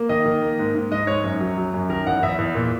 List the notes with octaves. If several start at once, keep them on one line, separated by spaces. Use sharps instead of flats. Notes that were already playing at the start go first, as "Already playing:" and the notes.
Already playing: A#3
D#3 D#5
D#3
A#3
G#2
G#2
G#2 D#5
G#2 C#5
F#2
F#3
F#3
F#2
D#3 A#4
E2 F#5
E2 E5
E2
A#2